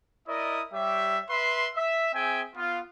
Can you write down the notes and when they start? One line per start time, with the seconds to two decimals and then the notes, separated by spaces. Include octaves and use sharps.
0.28 E4 A#4 D5 D#5 D#6
0.73 G3 G4 C#5 E5
1.30 B4 E5 C6
1.75 E5
2.14 C4 G#4 E5 G5 G#5
2.55 B3 F4